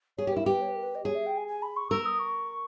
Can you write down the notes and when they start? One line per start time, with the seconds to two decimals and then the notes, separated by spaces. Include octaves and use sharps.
0.18 G#4 C#5
0.27 G4
0.33 E4 A#4
0.46 G4 B4
0.62 C#5
0.68 B4
0.76 A#4
0.83 B4
0.95 D#5
1.05 G#4 C#5
1.15 E5
1.26 G5
1.37 G#5
1.48 G#5
1.62 B5
1.77 C#6
1.91 A#4 E6
2.06 D#6
2.19 C#6